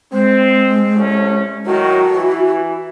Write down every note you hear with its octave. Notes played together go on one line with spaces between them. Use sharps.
G#3 C4
C2 A3 C#4
A2 D#3 F#3 F#4
E3